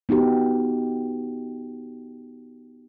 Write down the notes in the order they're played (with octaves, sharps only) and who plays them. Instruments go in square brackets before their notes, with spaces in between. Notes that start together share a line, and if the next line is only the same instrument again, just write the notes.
[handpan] B3 D#4 F#4 G4